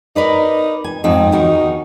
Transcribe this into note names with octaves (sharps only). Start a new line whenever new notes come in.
D#4 A#4 B4 D5
G#5
F2 G#2 C4 D#4
E2 D#3 F#4